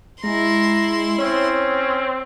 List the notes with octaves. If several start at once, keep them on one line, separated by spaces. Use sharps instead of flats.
G#3 E4 A#5 C6
C4 C#4 C#5